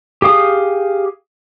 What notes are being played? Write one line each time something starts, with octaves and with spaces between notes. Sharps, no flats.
G4 G#4 F5 D#6